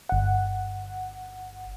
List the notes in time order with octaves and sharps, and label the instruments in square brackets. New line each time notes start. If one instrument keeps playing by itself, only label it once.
[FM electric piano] G1 F#5